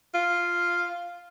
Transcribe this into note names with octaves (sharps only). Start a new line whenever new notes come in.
F4